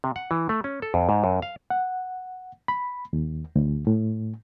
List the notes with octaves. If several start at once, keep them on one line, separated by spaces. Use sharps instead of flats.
C3
F#5
E3
A3
C#4
A4
F2
G#2
F#2
F5
F#5
B5
D#2
D2
A2